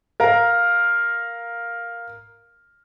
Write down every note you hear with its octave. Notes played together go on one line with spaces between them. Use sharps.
A#4 F5 A#5